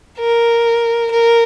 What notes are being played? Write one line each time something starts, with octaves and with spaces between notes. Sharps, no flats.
A#4
A#4